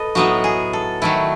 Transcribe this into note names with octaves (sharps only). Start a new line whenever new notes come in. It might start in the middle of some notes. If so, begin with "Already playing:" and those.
Already playing: A4 B4 D#5
A2 F#3 B3 D#4 F#4
G#4
A4
D#3 F#3 A3 E4 B4